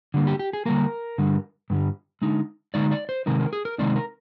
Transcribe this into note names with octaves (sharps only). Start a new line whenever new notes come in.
D3 G3 A#3
G4
G4
G#4
D3 G3 A#3 A#4
G2 D3 G3
G2 D3 G3
D3 G#3 D#4
D3 G#3 D#4 D5
D5
C5
C3 D#3 G#3 C4 D#4 A#4
A#4
G#4
A#4
C3 D#3 G#3 C4 D#4 D5
A#4